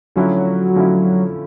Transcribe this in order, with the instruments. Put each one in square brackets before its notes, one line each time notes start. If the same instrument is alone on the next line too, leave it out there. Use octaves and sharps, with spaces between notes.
[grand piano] D3 F3 A3 C#4 E4 [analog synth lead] F#3
[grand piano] D3 F3 A3 C#4 E4